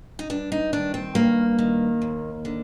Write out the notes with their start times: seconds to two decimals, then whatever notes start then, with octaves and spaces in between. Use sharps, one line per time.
0.19 D#4
0.30 G2 D4
0.52 D#4
0.73 D#3 D4
0.94 C4
1.15 G2 A#3
1.59 D#3
2.02 D#2
2.45 D3